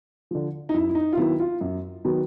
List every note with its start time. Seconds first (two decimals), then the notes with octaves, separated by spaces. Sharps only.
0.31 D3 F3
0.69 D#4
0.74 F#2 E4
0.89 E4
0.95 D#4
1.13 F4
1.17 D#3 F#3 B3 E4
1.40 F4
1.61 F#2
2.05 D#3 F#3 B3